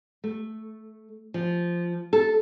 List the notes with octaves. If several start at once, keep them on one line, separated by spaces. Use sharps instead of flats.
A3
F3
A4